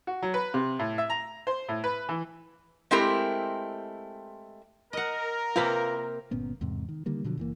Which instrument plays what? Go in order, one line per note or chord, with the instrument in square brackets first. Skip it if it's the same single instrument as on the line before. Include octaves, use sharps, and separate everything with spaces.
[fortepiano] F#4
F#3
B4
C3
A2
E5
A#5
C5
A2
B4
E3
[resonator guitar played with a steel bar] G#3 A3 C4 E4 G4 A#4
[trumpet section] A#4 [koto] D#5 F#5
[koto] C3 A#3 C4 [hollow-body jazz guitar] F4 B4
[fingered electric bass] G1 A#2 B3 C#4
E2 G#2 C3
D#3
D3 D#3 G3 A#3
B2 D3 F3 F#3
F#1 E3 A#3